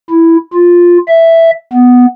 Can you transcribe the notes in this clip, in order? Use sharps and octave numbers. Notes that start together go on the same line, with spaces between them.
E4
F4
E5
B3